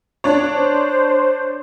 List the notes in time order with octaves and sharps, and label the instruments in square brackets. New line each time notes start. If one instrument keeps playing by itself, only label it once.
[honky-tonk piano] D4 C#5
[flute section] C5